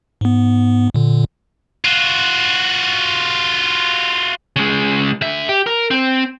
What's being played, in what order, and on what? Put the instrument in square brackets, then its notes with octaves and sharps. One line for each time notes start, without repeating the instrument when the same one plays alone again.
[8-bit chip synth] G#2 B3
A#2 D3
[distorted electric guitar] F4 F#4
[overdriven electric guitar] C#3 G#3
D3 E5
G4
A#4
C4